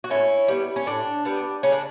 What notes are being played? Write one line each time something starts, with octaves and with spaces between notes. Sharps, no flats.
F#4
A2 C#4 E4
G3 B3
C#4
A2 D4
G3 B3
C#3 C#4
D4